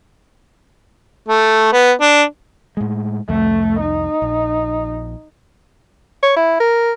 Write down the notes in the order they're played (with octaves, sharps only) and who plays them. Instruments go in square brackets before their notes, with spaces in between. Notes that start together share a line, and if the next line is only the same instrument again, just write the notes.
[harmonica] A3
B3
D4
[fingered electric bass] A2 G#3
[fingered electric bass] C2 F2 [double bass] A3
[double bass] D#4
[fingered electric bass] A#1
[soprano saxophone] C#5
E4
A#4